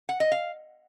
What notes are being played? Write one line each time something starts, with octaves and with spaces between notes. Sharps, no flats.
F#5
D#5
F5